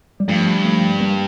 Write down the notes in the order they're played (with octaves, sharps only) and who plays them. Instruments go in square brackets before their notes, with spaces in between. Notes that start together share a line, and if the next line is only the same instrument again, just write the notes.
[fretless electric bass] G3
[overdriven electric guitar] G2 [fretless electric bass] F3 A3
[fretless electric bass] F3 A3
G3 A#3